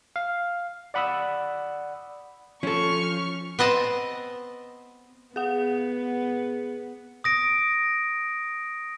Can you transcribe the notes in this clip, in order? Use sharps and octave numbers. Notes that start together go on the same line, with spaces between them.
F5
D5 F#5 B5 D#6 E6
F3 C#4 A4 C#6 F6
B3 C4 D#5 A5
B3 G#4 F#5
D#6 A#6 D7